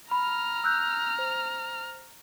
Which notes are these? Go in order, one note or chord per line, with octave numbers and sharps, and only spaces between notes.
A#5 B5 F6
E6 F#6 G6
C5